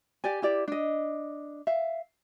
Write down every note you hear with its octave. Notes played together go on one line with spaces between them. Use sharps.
G4 D5 G#5
E4 G4 D5
D4 D#5
E5 F5